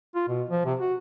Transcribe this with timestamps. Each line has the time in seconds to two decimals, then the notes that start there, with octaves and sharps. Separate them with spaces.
0.15 F4
0.28 B2
0.50 F3
0.65 C3
0.79 F#4